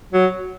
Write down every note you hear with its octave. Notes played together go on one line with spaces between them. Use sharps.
F#3